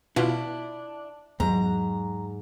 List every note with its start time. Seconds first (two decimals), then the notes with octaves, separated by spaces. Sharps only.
0.16 B2 D4 E4 F4
1.40 E2 G#2 F#3 A#5